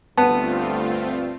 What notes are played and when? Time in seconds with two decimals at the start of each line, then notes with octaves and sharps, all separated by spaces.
0.17 D2 G2 A3 B3 C4 F4 A5